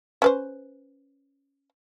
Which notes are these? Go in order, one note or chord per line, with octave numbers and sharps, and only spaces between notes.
C#4 B4 C5